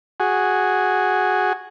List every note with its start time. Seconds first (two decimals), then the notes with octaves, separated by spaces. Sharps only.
0.20 F#4 G#4